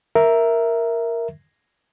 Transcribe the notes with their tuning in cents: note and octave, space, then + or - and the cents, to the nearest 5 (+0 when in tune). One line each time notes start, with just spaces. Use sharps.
A#4 +0 E5 +0